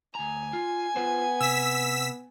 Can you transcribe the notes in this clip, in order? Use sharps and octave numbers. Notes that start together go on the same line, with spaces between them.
D2 G#5 A#5
F4
B3 F4 B4 C5
C3 E6 B6